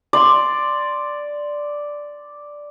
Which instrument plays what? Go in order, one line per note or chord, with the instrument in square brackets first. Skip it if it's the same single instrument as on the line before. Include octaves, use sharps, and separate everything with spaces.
[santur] D5 C6